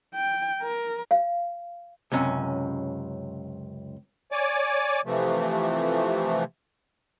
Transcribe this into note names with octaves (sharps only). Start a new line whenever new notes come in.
G5
A#4
F5
C#2 F#2 C3 C#4
C#5 D5 G#5 D6
C3 E3 F3 A3